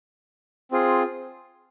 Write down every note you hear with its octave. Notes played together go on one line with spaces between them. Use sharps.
C4 F4 G#4